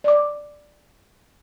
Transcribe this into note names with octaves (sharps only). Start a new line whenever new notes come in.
D5 D6